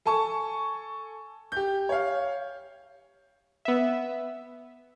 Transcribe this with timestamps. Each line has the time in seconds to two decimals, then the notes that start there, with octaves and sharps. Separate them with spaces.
0.06 A4 G#5 A5 C#6
1.52 G4 G6
1.89 C#5 F5
3.65 B3 E5